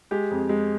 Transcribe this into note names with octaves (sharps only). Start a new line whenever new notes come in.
G#3 G4
F2
G#3